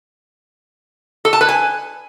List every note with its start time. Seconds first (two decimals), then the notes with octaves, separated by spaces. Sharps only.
1.25 A4
1.33 A5
1.41 B4
1.49 G#5